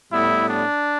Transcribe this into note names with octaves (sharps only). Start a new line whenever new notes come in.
A2 G3 B3 E4
D4